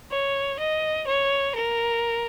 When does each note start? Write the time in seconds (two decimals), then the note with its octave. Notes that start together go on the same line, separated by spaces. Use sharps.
0.11 C#5
0.60 D#5
1.07 C#5
1.55 A#4